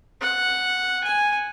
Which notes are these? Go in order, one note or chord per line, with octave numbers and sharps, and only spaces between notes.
F#5
G#5